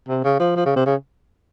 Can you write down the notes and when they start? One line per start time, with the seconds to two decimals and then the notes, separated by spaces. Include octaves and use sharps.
0.08 C3
0.24 C#3
0.40 F3
0.56 F3
0.65 C#3
0.76 C3
0.86 C#3